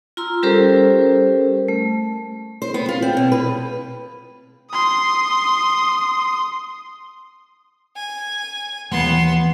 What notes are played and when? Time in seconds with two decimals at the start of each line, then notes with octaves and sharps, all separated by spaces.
0.17 F4 A#5 C6 E6
0.43 G3 C#4 G4 A4 A#4 C5
1.68 A3
2.62 C5
2.74 B3
2.89 F4
3.02 C4
3.17 B2
3.32 B4
4.71 C6 D#6
7.96 G#5
8.91 D#2 E3 B3 C6